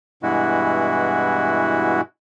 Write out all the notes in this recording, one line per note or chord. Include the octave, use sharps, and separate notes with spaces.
G2 B2 E3 G#3 E4 F#4